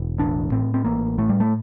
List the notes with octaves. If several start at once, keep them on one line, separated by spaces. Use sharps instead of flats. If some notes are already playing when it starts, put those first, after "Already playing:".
Already playing: E1
A1 D4
A2 C4
C4
A1 A#3
A2 A3
G3
A3